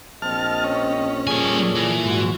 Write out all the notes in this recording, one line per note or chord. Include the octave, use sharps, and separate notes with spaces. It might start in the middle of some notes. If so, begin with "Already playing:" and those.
A#1 C4 D#5 A5 F6
C#4
A#2 G3 G#4 A4 D5 G#5
E3
G#2 F#4